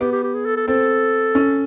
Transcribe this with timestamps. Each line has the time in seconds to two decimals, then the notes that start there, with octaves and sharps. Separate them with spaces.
0.01 B3 G4
0.12 G4
0.23 G4
0.34 G#4
0.46 A4
0.57 A4
0.67 C4 A4
1.35 C#4